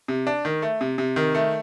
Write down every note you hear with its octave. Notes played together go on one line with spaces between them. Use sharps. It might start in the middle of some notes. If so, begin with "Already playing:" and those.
C3
D4
D#3
A3
C3
C3
D#3
A3